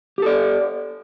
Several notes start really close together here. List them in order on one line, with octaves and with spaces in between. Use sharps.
G4 A4 D5